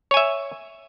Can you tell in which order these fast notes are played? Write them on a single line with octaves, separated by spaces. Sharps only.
C#5 G#5 E5